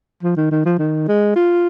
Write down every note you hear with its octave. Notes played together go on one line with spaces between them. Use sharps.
F3
D#3
D#3
F3
D#3
G#3
F4